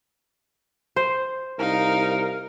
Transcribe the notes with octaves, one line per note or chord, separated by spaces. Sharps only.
C5
C2 D#4 A#4 F5